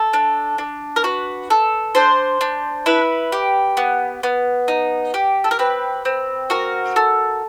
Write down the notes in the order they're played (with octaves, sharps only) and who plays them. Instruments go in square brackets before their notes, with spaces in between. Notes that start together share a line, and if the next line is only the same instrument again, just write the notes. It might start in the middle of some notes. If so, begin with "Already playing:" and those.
Already playing: [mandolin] A4
D4
D4
A#4
F#4 B4
A4
D4 C5
D4
E4 B4
G4
B3
B3
D#4
G4
A4
A#4
C4 B4
C4
F#4 A#4
A4